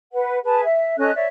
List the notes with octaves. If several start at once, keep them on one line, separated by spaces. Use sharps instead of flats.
B4 F#5
G#4 B4 A5
E5
C#4 A4 D#5 F#6
C#5 D5 E5